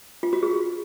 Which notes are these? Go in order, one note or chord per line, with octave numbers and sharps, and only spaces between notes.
F4
F#4
G#4